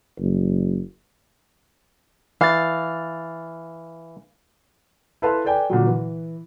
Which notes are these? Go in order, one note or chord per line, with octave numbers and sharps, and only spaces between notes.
F#1
E3 F5 A6
E4 A4 B4 F5 A5 C6
A4 B4 D5 G5 G#5
A#2 D3 F#3
E3